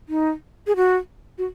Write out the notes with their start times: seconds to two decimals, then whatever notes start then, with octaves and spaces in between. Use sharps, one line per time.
0.09 D#4
0.67 G#4
0.76 F#4
1.38 F#4